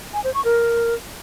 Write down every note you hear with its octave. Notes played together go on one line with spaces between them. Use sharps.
G#5
C5
C#6
A#4